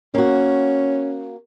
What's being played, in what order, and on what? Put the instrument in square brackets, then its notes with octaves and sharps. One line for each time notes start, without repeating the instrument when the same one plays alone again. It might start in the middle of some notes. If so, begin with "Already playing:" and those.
[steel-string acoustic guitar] A#3 F#4 [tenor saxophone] C#4